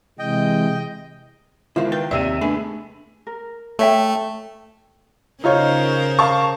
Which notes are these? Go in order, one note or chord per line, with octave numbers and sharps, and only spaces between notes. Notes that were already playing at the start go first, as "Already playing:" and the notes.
C3 E3 G#3 D#5 G5
C#2 D#3 E4 F4 C5
B4 G5
D#2 C3 D5 E5 E6 D#7
A3 B3 D4 G#4
A#4
A3 C#5 E5 G5
C#3 D#4 F4 A#4 C5 C#5
F5 A5 C#6